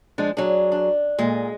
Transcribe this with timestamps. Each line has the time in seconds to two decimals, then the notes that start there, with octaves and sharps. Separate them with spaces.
0.18 F3 G#3 D4
0.37 F#3 D4 G#4
0.72 D4
1.19 A#2 G#3